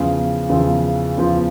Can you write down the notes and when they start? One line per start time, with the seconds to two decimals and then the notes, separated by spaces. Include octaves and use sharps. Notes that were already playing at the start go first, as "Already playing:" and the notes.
Already playing: E2 C#3 F3
0.49 E2 C#3 F3
1.18 E2 C#3 F3